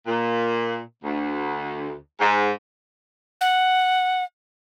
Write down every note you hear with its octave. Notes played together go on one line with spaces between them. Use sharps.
A#2
D2
G#2
F#5